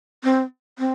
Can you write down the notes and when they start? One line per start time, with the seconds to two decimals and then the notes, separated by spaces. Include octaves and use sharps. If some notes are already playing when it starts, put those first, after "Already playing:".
0.24 C4
0.79 C4